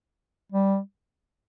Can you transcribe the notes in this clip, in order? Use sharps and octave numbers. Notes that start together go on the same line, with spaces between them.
G3